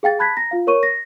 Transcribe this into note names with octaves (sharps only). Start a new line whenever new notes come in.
G#4 F5 G5 A6
A5 B5 F#6 G#6 A6 B6
A#5 A#6
F4 F5
A#4 C#5 C#6 D#7
A#6